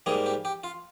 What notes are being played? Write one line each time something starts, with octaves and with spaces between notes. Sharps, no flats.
G#2 G3 A#3 G#4
G4
G4
F4